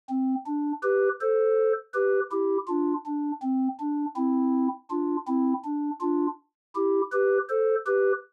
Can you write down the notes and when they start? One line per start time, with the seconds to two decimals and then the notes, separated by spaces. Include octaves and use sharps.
0.09 C4
0.46 D4
0.83 G4 B4
1.21 A4 C5
1.94 G4 B4
2.32 E4 G4
2.68 D4 F4
3.05 D4
3.42 C4
3.79 D4
4.16 C4 E4
4.90 D4 F4
5.28 C4 E4
5.64 D4
6.01 D4 F4
6.75 E4 G4
7.12 G4 B4
7.49 A4 C5
7.86 G4 B4